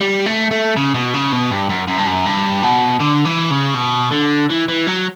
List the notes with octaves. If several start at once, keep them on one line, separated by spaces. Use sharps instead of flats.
G3
A3
A3
C#3
B2
C#3
B2
G2
F#2
F#2
G2
F#2
G2
B2
D3
E3
C#3
B2
D3
E3
E3
F#3